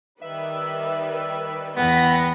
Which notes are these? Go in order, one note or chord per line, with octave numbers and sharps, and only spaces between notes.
D#3 G3 B4 E5
E2 B3 G5 B5 A#6 B6